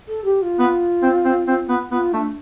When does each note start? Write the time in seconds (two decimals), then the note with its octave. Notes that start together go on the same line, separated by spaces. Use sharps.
0.09 A4
0.24 G4
0.42 F4
0.59 B3
1.03 C4
1.25 C4
1.47 C4
1.69 B3
1.91 B3 F4
2.13 A3 D4